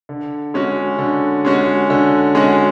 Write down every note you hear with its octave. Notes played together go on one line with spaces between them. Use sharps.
D3
G#3 C#4 F#4
D3
G#3 C#4 F#4
D3
G#3 C#4 F#4